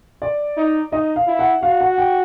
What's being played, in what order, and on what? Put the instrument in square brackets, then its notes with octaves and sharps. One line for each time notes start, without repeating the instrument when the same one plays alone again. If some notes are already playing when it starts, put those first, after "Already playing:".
[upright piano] D5
[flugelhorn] D#4
[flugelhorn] D#4 [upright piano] D#5
[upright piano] F5
[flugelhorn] E4
[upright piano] F#5
[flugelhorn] F#4 [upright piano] F5
[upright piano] F#5
G5